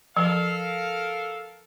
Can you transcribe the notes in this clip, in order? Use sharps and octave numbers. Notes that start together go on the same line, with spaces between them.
F3 A4 A#4 F5